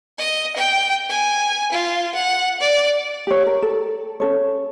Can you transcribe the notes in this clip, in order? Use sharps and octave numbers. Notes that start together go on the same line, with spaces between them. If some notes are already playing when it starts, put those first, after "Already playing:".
D#5
G5
G#5
F4
F#5
D5
G4 C#5
A#4
A4
C#4 A4 C#5